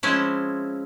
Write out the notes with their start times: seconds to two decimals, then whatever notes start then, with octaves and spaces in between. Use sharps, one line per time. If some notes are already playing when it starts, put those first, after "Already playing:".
0.03 F3 G#3 C4 C#4 E4